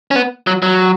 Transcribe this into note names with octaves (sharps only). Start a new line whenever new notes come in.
C#4
B3
F#3
F#3